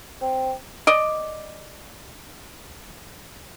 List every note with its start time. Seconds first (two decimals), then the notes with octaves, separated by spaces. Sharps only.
0.21 C4
0.87 D5 D#5